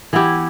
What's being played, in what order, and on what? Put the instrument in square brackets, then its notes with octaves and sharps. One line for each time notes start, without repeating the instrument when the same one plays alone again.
[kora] E3 B3 E4 G4